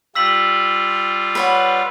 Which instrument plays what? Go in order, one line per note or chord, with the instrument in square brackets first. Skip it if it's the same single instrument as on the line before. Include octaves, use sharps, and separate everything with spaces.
[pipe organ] G3 F4 [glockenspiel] E6 B6 F#7
[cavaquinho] B4 C#5 F#5